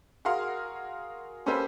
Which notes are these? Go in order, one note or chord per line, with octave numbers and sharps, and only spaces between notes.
F#4 G#4 A#4 F5 C6
A#3 C#4 G4 A4 B4 C5